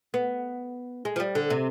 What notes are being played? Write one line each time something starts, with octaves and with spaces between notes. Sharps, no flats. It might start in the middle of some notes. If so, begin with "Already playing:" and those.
B3
G#3
F3
G3
D3
C3